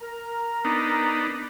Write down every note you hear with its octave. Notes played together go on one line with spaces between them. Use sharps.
A#4 A#5
B3 D4 D#4